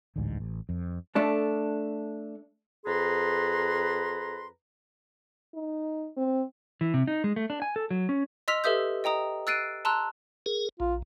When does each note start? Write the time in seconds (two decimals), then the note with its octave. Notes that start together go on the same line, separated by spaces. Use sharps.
0.16 D1 A1 D2 G#2
0.40 A1
0.69 F2
1.15 A3 D4 A4
2.86 F2 G#4 B4 A#5 C6
5.55 D#4
6.17 C4
6.81 E3
6.94 C3
7.07 D#4
7.24 G#3
7.36 A3
7.50 D4
7.62 G#5
7.76 A4
7.91 F#3
8.09 C#4
8.48 D#5 C6 E6 F6 B6 F7
8.64 G4 A4 B4 E5 D#6 G6
9.04 D#5 G5 A#5 D#6
9.47 E6 F#6 A6 C7 D7 D#7
9.85 A5 A#5 C6 E6 F#6
10.46 G#4 A#4
10.80 A#1 F4